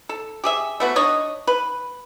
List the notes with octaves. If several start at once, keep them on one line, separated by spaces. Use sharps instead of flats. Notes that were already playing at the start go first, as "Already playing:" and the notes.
A4
G4 G#4 E5
A3 B3 F#4
D4 C#5 D#5
B4